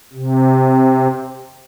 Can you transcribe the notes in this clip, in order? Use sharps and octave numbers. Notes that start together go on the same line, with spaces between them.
C3